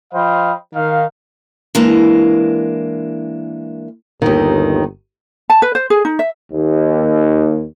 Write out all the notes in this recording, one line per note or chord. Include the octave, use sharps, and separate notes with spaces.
F3 C5 D#5 F5 G5 B5
D#3 F5
E3 G#3 A#3 D4
G1 D#2 D#3
A5
B4
C5
G#4
D#4
E5
D#2